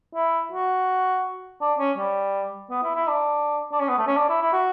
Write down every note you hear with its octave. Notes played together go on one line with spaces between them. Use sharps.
E4
F#4
D4
C#4
G3
B3
E4
E4
D4
D4
C#4
B3
A3
C#4
D4
E4
E4
F#4